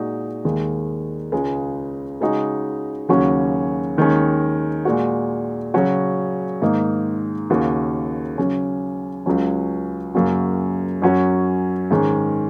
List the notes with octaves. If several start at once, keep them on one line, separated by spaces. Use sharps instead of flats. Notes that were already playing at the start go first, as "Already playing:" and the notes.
Already playing: A#2 G#3 D#4 F#4
D#2 D#3 G#3
C#2 C#3 G#3
C#3 G#3 D#4 F#4
D#2 C#3 F#3 C#4 F#4
D#2 D#3 G#3 C#4
A#2 G#3 F#4
C#3 F#3 C#4 F#4
G#2 D#3 A#3 D#4
D#2 C#3 A#3 F#4
C#3 F#3 C#4
C#2 C#3 F#3 C#4
F#2 C#3 A#3 C#4 F#4
F#2 F#3 C#4 F#4
G#2 D#3 G#3 C#4